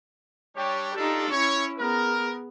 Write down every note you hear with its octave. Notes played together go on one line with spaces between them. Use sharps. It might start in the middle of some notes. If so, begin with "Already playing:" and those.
G3 D4 G4 C#5
D4 D#4 F4 G4 A4
C#4 E4 C#5
B3 G#4 A#4